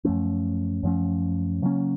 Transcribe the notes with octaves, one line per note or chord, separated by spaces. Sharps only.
F#2 F3 A3 C#4
F#2 F3 A3 C#4
C#3 F#3 A#3 C#4